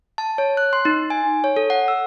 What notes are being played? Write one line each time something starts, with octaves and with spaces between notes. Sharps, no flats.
A5
C#5
F#6
C6
D#4
G#5
C#5
A4
F#5
E6